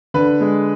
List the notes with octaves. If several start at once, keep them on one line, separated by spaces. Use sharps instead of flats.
D3 B4
G#3